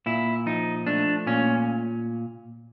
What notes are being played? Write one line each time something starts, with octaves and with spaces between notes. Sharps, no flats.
A#2 E4
F3 D#4
A3 D4
A#2 C#4